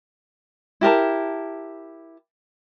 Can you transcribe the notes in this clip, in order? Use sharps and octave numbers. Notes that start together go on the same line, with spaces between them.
E4 G4 A#4 A5